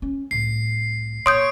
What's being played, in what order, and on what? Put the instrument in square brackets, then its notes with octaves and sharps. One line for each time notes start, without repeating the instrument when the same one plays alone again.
[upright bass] C#4
[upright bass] C2 A2 [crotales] C7
[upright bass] A#2 [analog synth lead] C#5 [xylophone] C6 D#6 G6 [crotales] D7